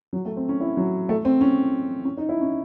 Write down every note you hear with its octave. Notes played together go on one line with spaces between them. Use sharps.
F#3
A3
C4
C#4
E4
F#3
A3
C4
C#4
C#4
D#4
E4
C#4